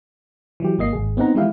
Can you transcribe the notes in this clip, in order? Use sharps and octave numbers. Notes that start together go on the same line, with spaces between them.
E3 F#3 G4
G#1 A#3 D#5 C7
G#1 G#4
B3 C4 D#4 F#5 A#5
E3 F3 G#3 E4 G4 F5